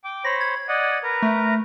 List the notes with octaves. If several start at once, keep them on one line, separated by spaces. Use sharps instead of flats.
G5 D6
C5 C#5 B5 A#6
G#6
D5 D#5 F#5
A#4 B4 A#5
A3